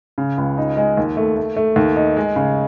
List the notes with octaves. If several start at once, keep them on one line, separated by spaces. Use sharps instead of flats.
C#3
C#2
D#4
G#3
D#2
A3
A3
A3
D#2
D#4
G#3
C#3